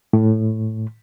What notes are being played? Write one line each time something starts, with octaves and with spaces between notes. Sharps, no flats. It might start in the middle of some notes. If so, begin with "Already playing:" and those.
A2